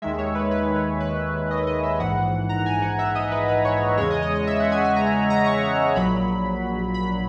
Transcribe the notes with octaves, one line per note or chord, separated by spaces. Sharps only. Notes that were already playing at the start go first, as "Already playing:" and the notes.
D#2 D#3 G#3 E5
C#5
B4
B4
C#5
B4
D#5
D#5
E5
A#1 G#2 E3 F#5
A#5
G#5
F#5
E5
D#5
B4
B4
C#5
E2 C#3 G#3 C#5
D#5
D#5
D#5
E5
F#5
G#5
G#5
A#5
A#5
C#6
A#1 A#2 F#3 B5
B5